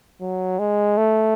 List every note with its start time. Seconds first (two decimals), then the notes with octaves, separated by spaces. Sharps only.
0.21 F#3
0.59 G#3
0.98 A3